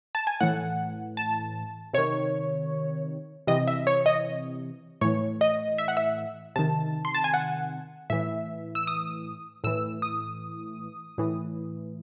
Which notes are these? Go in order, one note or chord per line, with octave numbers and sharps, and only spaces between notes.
A5
G#5
A2 E3 F#5
A5
C3 D#3 C#5
C3 E3 D#5
E5
C#5
D#5
A2 E3 C#5
D#5
E5
F#5
E5
C3 D#3 A5
C6
A5
G#5
F#5
A2 E3 E5
E6
D#6
A2 E3 E6
D#6
A2 E3